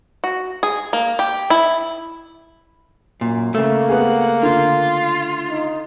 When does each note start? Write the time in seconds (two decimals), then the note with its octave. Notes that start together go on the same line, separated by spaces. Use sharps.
0.24 F#4
0.63 G#4
0.93 A#3
1.19 G4
1.50 E4
3.21 F#2 A#2
3.55 C#3 A3 A#3
3.89 B3 G#4 F#5
4.43 D3 F4
5.49 D#4